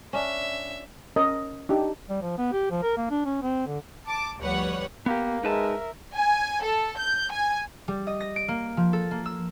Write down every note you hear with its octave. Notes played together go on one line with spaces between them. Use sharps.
C#4 D4 E5
C#4 A#4 D#5
D4 D#4 G4
G3
F3
B3
G4
F3
A#4
A#3
D4
C#4
C4
D3
A5 D6
D2 F3 G3 B4 C#5 F#5
A#3 B3 G4
G#3 D#4 A#4 B4 E5 A5
G#5
A4
G6
G#5
G3
D#5
A#6
D7
A#3
F3
A4
A#3
E6